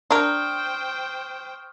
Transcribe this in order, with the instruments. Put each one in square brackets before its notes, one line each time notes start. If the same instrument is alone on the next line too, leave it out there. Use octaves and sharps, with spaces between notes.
[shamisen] D4 A#4 [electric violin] C5 G5 [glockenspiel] C#6 D#6 F6